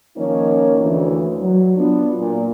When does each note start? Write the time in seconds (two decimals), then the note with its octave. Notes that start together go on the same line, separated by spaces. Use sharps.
0.17 D#3 F3 A#3 C#4 D#4 C#5
0.81 D2 E3
1.41 F#3
1.77 B3 D4 F4
2.19 A#2